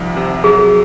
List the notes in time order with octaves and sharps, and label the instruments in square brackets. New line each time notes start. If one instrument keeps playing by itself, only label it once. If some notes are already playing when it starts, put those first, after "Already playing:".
Already playing: [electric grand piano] C2 D#3 F3
C3
[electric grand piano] F#3 [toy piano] G#4